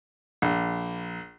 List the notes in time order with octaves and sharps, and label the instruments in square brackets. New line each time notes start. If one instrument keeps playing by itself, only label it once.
[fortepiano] A#1